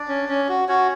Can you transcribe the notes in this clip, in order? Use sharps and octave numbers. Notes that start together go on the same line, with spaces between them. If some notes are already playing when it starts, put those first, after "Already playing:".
Already playing: D4 D5
C#4
C#4
F#4
C#4 F#4 C#5